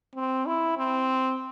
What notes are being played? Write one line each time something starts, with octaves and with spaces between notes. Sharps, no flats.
C4
E4
C4